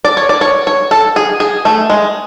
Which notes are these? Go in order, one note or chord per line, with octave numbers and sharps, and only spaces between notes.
D5
C#5
D5
C#5
C#5
A4
G#4
G#4
A3
G#3